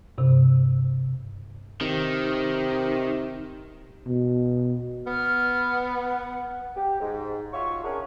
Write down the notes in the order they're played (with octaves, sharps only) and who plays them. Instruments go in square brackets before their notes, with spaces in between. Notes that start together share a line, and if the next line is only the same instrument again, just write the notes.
[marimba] G2 C3
[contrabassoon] C3 [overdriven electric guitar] D#3
[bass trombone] B2
[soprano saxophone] B3 [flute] F6
[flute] F#5
[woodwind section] G4
G#2
F4 F#4 C#5 E5 C#6
C#4 D4 G#4 A#4